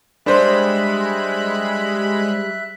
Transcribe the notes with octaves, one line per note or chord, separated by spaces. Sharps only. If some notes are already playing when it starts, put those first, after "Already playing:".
G3 G#3 D4 C5 E5 B5 F#6